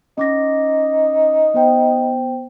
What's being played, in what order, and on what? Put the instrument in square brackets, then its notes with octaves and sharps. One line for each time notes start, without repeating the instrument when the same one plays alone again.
[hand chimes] C#4 D6 A#6 [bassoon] D#4
[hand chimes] B3 C5 G5